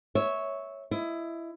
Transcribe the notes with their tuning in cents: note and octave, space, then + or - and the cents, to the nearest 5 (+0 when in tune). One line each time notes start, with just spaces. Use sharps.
C#5 +0 E5 -15
E4 +20 D#5 +25